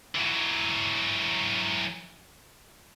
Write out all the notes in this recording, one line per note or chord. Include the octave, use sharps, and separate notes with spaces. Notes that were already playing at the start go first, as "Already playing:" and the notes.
E3 F#3